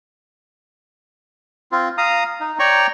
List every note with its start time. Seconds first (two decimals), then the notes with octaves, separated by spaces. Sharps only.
1.72 C4 F4
1.98 F5 A#5 D#6
2.40 D#4
2.59 C#5 D5 G5 A#5 C#6